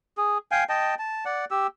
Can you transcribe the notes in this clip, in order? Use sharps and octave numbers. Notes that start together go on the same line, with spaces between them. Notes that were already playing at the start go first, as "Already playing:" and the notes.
G#4
F5 G5 G#5
D#5 G5 A5
A5
D5 F#5
G4 E6